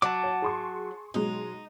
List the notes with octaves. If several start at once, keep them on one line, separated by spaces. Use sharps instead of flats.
F#3 A5 D6
C#5 F#5
G#4 C6 C#6
B2 F#3 G#3 D#4